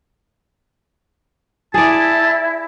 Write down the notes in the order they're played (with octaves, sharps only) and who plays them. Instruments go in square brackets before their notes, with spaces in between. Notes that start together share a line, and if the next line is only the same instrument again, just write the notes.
[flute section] E4 [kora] G#4 D5 [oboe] A5